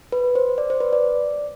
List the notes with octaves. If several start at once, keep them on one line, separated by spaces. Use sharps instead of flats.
B4
C5
D5
C5
B4
D5